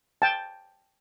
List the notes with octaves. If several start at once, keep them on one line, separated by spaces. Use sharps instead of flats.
G5 A5